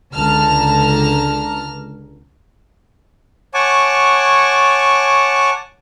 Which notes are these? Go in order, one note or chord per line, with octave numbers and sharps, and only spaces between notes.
C#2 D3 A5 A#5 F6
C#5 F#5 G#5 A5 C#6 D6